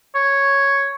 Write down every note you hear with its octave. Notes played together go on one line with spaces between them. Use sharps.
C#5